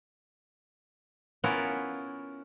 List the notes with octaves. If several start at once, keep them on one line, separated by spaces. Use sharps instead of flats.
B3 C#4 E4 F4 A#4